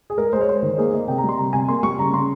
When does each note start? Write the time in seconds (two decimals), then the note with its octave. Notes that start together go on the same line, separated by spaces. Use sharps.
0.10 G#4
0.18 G#3 A#4
0.33 G#3 C5
0.41 C#5
0.47 G#3 C5
0.63 D#3
0.78 A#3 G#4
0.93 A#3 D#5
1.08 C3 G5
1.18 A#5
1.24 G3 C6
1.38 C3 A#5
1.53 C3 G#5
1.68 A#3 C6
1.83 G3 C#6
1.98 C#3 A#5
2.13 C#3 C6